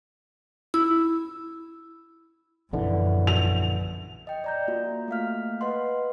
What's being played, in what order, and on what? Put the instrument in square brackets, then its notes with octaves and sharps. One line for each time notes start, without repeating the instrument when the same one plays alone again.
[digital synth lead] E4 [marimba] E6
[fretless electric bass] A#1 D3 E3 [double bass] F#2
[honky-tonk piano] F7
[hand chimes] D#5 G5
D5 A#5 G6
A#3 F4 F#4
A3 A#3 F5 F6
B4 D#5 F#5 C6